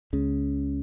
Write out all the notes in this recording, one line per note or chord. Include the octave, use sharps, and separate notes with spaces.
C#2 C#3